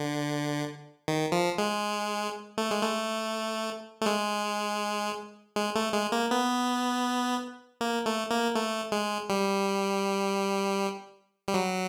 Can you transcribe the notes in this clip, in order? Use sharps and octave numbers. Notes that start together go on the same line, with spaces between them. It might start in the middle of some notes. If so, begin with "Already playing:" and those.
Already playing: D3
D#3
F3
G#3
A3
G#3
A3
A3
G#3
G#3
A3
G#3
A#3
B3
A#3
A3
A#3
A3
G#3
G3
G3
F#3